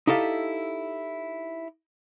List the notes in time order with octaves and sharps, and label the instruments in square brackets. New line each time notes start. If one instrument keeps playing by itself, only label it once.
[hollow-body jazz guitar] D#4 E4 G4 A4 F5